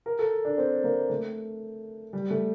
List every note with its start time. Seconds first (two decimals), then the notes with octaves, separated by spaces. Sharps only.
0.06 A#4
0.19 A4
0.45 D4
0.58 C4
0.84 A#3
1.10 A3
2.13 G3
2.31 A3